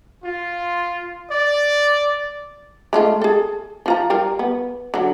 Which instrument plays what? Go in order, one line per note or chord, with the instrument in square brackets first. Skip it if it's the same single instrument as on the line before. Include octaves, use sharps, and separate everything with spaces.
[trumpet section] F4
D5
[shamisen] G#3 A3 F4
G#4 A4
F3 F4 A#5
G3 F4 A#4
B3
D3 F#3